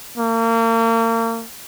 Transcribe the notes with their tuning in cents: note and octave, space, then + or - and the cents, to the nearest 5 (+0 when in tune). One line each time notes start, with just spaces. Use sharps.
A#3 -35